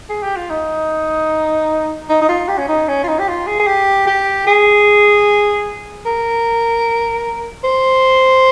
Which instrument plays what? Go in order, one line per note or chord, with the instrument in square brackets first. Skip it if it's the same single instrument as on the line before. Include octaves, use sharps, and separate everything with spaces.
[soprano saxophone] G#4
G4
F4
D#4
D#4
D#4
F4
G4
C#4
D#4
C#4
F4
D#4
G4
F4
G#4
G#4
G4
G4
G#4
A#4
C5